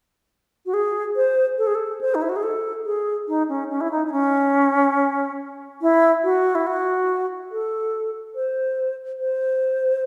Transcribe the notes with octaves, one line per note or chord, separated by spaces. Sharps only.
F#4
G#4
C5
A4
G#4
A4
C5
D#4
E4
F#4
G#4
A4
G#4
D#4
C#4
C#4
E4
D#4
D#4
C#4
E4
F#4
E4
F#4
A4
C5
C5